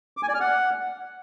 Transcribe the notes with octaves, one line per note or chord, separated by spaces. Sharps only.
D6
G#5
D5
F6
F#5